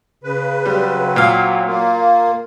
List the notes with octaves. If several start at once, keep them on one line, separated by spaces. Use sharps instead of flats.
C#3 B4
F#3 G3 C4
A#2 F5
A#3 F4